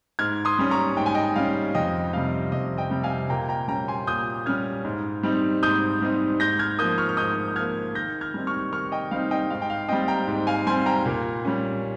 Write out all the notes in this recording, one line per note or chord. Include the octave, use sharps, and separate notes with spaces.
G#2 F6 G#6
C6 D#6
G3 C#4
A#5 C#6
G#2 G5
G#5
D#5 G5
G3 C#4 F5
F2 D#5 G5
C3 G3 F5
F2 D#5
D#5 G5
C3 G3
F5 G#5
A#2 G5 A#5
G5 A#5
G3 C#4 G5 A#5
G#5 C6
A#2 D#6 G6
G3 C#4 F6 G#6
G#2
G3 C4 D#4
G#2 D#6 G6
G3 C4 D#4
G#2 G6 A#6
F6 G#6
F3 A#3 D#6 G6
C#6 F6
F6
G#2 D#6 G6
F3 A#3 F6 G#6
D#3 G6 A#6
F6 G#6
G3 C4 D#4
C#6 F6
D#3 C#6 F6
D#5 G5
G3 C4 D#4 F5
D#5 G5
G#2 F5
G5
F5
G3 C4 D#5 G5
G5 A#5
G#2
F5 G#5
G3 C4 G#5 C6
G5 A#5
A#2
G3 C#4